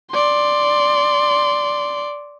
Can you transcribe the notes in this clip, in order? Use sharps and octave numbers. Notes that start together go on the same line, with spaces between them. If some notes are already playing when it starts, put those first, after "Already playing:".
D5 C6